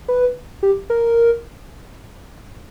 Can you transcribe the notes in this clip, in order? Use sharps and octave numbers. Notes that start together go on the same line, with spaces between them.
B4
G4
A#4